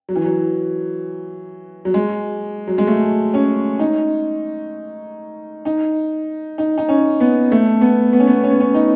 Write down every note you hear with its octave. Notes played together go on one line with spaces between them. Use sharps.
F#3
E3
F#3
F#3
G#3
F#3
G#3
A3
C#4
D#4
D#4
D#4
D#4
C#4
B3
A3
B3
B3
C#4
B3
C#4
B3
C#4
D#4